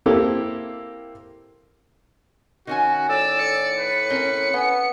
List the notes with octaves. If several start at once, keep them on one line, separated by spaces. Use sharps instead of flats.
A#3 C4 E4 G4 A4
D#3 C#4 F#4 G#5
A2 D5 E6
A2 C#7
B4
C4 C#4 A#4
B3 C#4